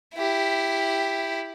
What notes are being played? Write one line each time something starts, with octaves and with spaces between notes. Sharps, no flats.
E4 G4